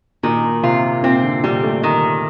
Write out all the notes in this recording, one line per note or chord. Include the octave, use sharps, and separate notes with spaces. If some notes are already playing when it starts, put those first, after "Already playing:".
A#2 D#3
C3 F4
A#2 C4
D3
A#2 G3
A3
D#3